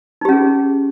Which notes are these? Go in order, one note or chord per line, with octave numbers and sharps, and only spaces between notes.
C#4 D#4 G4 G#4